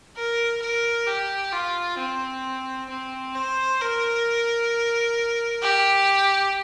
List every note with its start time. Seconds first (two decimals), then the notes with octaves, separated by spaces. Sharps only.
0.17 A#4
0.62 A#4
1.07 G4
1.53 F4
1.98 C4
2.90 C4
3.35 C5
3.81 A#4
5.63 G4